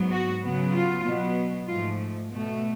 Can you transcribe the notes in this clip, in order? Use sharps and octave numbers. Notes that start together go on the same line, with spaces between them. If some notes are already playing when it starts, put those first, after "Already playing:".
Already playing: G#2 F#3 B3
F#4
C#3 F#3 B3
F4
B2 F#3 B3
G#2 F3 A3 F4
B2 A3